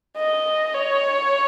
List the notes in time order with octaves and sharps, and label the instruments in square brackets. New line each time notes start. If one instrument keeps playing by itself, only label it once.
[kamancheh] D#5
C#5